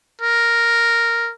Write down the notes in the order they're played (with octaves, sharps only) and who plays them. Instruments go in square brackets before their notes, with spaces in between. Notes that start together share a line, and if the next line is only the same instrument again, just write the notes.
[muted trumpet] A#4